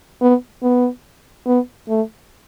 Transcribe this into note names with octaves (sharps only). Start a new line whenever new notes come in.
B3
B3
B3
A3